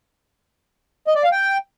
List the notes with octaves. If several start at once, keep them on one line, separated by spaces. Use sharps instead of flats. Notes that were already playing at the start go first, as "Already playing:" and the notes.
D#5
D5
F5
G5